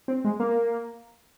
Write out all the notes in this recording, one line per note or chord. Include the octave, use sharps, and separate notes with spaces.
C4
G#3
A#3